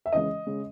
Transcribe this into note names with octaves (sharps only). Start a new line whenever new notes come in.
E5
C#3 E3 G#3 D#5
C#3 G#3